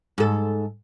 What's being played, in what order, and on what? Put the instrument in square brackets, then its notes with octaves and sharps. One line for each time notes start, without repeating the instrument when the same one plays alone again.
[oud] G#2 A4